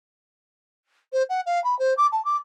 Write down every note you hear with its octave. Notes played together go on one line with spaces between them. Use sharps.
C5
F#5
F5
B5
C5
D6
A5
D6